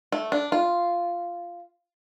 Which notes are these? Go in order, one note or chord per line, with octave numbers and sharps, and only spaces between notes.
A3
D4
F4